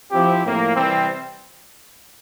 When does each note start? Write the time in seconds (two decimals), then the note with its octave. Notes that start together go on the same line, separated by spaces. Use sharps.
0.11 F3 C4 E4 G4
0.43 A2 F3 A#3
0.75 C3 E3 G3 C4